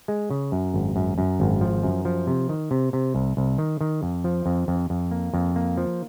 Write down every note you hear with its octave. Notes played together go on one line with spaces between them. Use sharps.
G#3
C#3
F#2
G#1
F#2
F#2
G#1
F3
F#2
F3
C3
D#3
C3
C3
C2
C2
D#3
D#3
F2
F3
F2
F2
F2
A#3
F2
A#3
F3